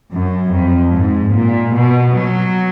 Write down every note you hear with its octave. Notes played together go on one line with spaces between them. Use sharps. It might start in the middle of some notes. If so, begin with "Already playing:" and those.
F#2
F2
G#2
A#2
B2
F#3